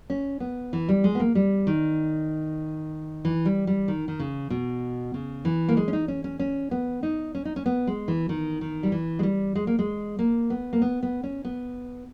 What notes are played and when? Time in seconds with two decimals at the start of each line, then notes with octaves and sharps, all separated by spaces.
0.10 C#4
0.40 B3
0.73 E3
0.89 G3
1.04 G#3
1.15 B3
1.20 A#3
1.35 G3
1.67 D#3
3.25 E3
3.45 G3
3.67 G3
3.88 D#3
4.08 D#3
4.19 C#3
4.50 B2
5.14 C#3
5.45 E3
5.68 A#3
5.77 G#3
5.88 C#4
5.93 D#4
6.08 C#4
6.24 C#4
6.39 C#4
6.71 B3
7.03 D#4
7.35 C#4
7.45 D#4
7.56 C#4
7.66 B3
7.87 G#3
8.08 E3
8.29 D#3
8.61 D#3
8.83 G3
8.92 E3
9.19 G#3
9.23 G3
9.55 G#3
9.67 A#3
9.79 G#3
10.19 A#3
10.50 B3
10.73 A#3
10.82 B3
11.03 B3
11.24 C#4
11.45 B3